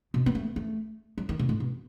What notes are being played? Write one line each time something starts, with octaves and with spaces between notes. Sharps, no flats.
B2
B3
A3
A3
F#3
D#3
B2
A2
B2